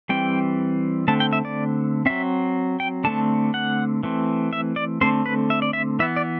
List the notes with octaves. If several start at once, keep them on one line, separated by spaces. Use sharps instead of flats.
E3 G3 C4 G5
D3 A3 C4 A5
G5
E5
D5
F#3 C4 E5
G5
D3 A3 C4 A5
F#5
E3 A3 C4
E5
D5
D3 A3 C4 C5
B4
E5
D5
E5
E3 B3 E5
D5